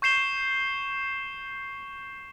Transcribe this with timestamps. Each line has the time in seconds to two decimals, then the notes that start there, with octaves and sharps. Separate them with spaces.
0.02 C#6 G6 C7 E7 G7